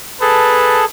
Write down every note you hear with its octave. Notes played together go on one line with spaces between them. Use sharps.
G#4 A4 B4 A5